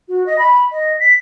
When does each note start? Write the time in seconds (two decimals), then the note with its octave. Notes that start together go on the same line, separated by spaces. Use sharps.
0.08 F#4
0.26 D#5
0.38 B5
0.71 D#5
1.00 B6